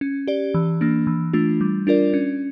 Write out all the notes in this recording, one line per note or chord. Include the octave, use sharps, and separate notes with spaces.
C#4
G4 D5
E3
A#3 D4
E3
A3 D4 F4
G3
D4 F4 A#4 D5
C#4